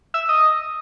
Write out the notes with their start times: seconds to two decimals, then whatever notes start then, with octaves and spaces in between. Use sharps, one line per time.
0.14 E5
0.29 D#5